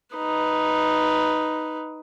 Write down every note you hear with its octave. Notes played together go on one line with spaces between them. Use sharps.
D#4 B4